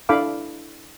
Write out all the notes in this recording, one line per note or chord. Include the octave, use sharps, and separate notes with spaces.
D4 E4 A4 F5 B5 D6